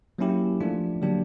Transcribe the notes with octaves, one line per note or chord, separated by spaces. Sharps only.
F#3 A#3 C#4 E4 G4
F3 A3 D4 F4
D3 F#3 A#3 D4 G4